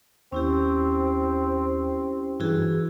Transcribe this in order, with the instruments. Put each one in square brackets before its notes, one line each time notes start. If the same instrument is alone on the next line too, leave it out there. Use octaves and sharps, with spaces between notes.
[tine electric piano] D#2 [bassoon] C4 [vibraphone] C#4 E4 G4
[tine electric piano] G2 E3 [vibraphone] E4 F#4 G#4